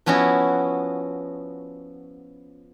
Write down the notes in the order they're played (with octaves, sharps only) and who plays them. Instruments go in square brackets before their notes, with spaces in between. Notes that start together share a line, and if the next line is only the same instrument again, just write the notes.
[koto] F3 B3 C#4 E4 F#4